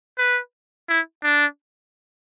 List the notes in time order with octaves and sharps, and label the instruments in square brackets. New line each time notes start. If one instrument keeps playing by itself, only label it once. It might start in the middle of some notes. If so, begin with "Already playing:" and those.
[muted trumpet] B4
E4
D4